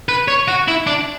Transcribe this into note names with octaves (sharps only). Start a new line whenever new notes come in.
B4
C#5
F#4
E4
D4